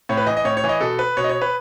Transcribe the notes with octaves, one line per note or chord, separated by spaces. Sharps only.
A2 C#5
B4
E3 D#5
D#5
A2 C#5
C#5
E3
D#5
B2 A4
B4
B2 C#5
D#5
C#5
B4